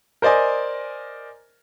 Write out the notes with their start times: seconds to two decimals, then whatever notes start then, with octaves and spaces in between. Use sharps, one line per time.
0.22 A#4 C5 D5 D#5 G#5